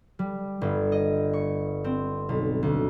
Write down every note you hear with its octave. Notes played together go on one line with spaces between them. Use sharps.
G3
G1
D#5
C#6
C4
B1
D2